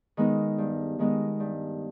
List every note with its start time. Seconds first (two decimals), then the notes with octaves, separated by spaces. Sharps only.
0.17 D#3 G#3 B3 D#4
0.58 G2
0.99 D#3 G#3 B3 D#4
1.40 G2